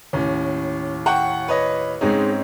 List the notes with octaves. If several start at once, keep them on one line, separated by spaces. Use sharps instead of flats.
D#2 A2 C#4
F#5 G5 C#6
B4 C#5 D#5
G#2 G#3 C4 C#4 D#4